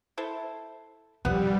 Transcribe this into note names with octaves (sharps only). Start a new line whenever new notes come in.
E4 A4 C5
G2 F3 G3 B3 C4 F#5